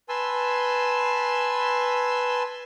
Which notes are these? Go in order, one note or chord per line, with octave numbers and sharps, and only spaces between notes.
B4 G#5 A5 C6 E6